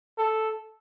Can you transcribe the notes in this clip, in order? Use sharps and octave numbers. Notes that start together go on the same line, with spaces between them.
A4